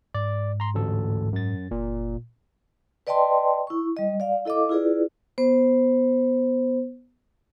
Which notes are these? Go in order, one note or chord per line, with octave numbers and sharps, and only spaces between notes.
G#2 D5
A#5 C6
A1 D2 A4
F#2 A6
F#1 A#2
B4 D5 D#5 G5 A5 C6
E4 C#6
G3 D#5
D5 F5
E4 A4 D#5 F5 D6
E4 F4 G#4 B4 D5
B3 C5